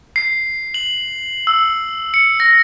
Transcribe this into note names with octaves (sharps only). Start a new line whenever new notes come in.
C7
F#7
E6
C#7
A#6